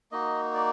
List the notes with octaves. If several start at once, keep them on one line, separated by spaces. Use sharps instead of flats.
A#3 D#4 F#4 D#5
D5